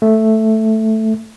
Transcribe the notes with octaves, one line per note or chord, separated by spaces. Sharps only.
A3